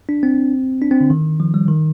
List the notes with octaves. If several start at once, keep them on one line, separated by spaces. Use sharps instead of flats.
D4
C4
D4
C4
D3
D#3
F3
G3
D#3